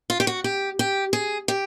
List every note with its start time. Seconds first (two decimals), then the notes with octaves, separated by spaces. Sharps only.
0.10 F4
0.20 G4
0.27 F#4
0.44 G4
0.79 G4
1.13 G#4
1.48 G4